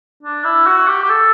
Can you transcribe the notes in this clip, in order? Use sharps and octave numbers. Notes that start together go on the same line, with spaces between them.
D4
E4
F#4
G4
G4
A4